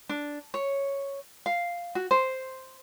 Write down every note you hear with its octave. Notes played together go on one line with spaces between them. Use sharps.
D4
C#5
F5
F#4
C5